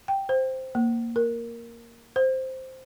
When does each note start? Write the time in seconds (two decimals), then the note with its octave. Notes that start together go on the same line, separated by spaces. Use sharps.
0.08 G5
0.29 C5
0.75 A#3
1.16 A#4
2.16 C5